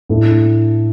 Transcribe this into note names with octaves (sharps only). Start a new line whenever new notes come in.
A2 A3 D4 A4